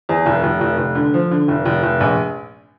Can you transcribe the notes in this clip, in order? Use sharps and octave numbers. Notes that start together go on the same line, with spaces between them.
E2
F1
F1
F1
F1
D3
F3
D3
F1
F1
F1
A#1